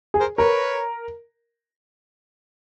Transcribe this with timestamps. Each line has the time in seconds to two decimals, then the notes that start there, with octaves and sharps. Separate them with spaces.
0.14 G#4
0.20 A#4 C5
0.38 A#4 B4 C#5